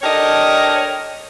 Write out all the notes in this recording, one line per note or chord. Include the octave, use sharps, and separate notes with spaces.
D4 G4 A4 A#4 C#5 D#5